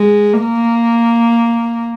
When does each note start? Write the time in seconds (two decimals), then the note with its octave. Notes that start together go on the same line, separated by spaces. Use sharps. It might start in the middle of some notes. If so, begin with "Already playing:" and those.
Already playing: G#3
0.41 A#3